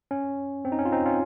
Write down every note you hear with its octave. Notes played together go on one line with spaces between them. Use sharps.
C#4
C4
D#4
C#4
F4
C4 D#4
C#4 F4